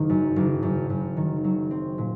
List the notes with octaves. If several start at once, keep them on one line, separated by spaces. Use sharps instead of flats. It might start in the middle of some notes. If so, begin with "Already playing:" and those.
Already playing: F#1 D#3
F#2
F#1
F#2
F#2
D#3
F#3
C4
A#2